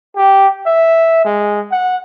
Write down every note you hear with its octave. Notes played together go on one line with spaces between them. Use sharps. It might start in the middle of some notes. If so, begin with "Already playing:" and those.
G4
E5
G#3
F#5